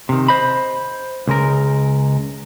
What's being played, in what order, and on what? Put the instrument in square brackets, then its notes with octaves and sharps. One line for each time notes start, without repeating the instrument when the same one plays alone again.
[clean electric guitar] C3 D#3
C5 D#5 B5
C#2 G#3 A#4